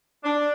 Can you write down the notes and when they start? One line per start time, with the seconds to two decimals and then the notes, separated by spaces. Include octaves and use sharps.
0.23 D4